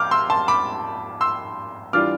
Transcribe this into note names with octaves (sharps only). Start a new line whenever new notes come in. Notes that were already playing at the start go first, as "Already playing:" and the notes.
Already playing: F2 D6 F6 G6
C6 E6
A5 C6
B5 D6
C6 E6
E3 G3 D4 F4 D6 F6